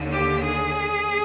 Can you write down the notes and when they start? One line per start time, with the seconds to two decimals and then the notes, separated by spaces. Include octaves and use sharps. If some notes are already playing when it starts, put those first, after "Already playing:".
Already playing: D#2 D3
0.13 G4
0.45 G#4